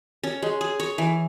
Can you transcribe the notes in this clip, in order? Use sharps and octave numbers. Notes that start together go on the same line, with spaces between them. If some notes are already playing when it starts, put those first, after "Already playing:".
C#4
G#3
G#4
C#5
E3